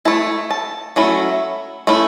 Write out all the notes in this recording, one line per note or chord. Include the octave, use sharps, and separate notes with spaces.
A3 E4 A5
A5
F#3 A3 C#4 E4
A3 C#4 E4